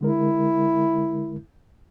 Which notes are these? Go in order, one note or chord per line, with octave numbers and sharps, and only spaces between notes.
D3 G#3 E4 A#4